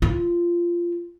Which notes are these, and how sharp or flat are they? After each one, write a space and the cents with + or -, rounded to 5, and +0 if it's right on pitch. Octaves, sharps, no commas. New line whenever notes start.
F4 -15